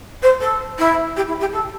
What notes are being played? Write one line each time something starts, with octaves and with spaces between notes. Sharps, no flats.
C5
A4
E4
G4
E4
G4
A4